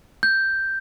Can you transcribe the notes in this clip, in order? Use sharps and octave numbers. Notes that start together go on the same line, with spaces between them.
G6